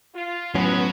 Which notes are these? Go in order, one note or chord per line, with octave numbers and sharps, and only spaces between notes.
F4
F#2 A2 F3 F#3 B3 C#4 B4